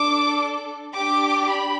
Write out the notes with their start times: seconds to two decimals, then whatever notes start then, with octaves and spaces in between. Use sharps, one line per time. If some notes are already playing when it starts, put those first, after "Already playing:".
Already playing: D4 A4 D6
0.93 D4 G4 D6
1.49 B5